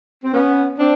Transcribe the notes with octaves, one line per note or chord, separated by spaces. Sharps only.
C4
B3 C#4
C4 D4